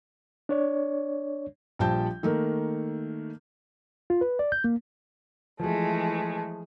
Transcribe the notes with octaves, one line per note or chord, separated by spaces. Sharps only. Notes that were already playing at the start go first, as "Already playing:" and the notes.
D4 C#5 D5
A#1 F3 G3 G5 A5 G6
D#3 A3 A#3
F4
B4
D5
G6
A#3
E3 F3 G#3 A3 G#4